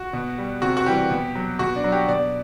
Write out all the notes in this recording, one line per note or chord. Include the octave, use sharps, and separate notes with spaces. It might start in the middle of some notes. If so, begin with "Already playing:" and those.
Already playing: F#4
B2
G3
C3 F#4
F#4
E3 G3 G4
B2
F#3
B2 F#4
D4
F#3
G4
B2 D5